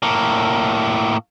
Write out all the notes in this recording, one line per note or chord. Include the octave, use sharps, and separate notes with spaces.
A2 A#3